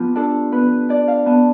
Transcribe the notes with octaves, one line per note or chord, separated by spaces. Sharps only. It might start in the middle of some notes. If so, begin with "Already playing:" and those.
Already playing: F3 B3 F4 G4
D4 A4
B3 B4
D4 D5
F5
B3 A5